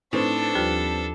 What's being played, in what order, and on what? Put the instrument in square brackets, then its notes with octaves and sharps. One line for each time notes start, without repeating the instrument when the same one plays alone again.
[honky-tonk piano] A2 [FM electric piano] C4 B4 C5 [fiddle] D4 A4 [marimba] D#4
[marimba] D#2 F3 F4 [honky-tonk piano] G3